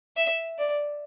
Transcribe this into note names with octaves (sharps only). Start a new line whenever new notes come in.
E5
D5